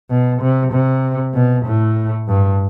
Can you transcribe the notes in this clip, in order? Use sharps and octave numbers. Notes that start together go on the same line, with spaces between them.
B2
C3
C3
B2
A2
G2